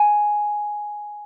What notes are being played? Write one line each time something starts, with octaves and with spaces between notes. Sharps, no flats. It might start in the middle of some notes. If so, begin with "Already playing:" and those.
Already playing: G#5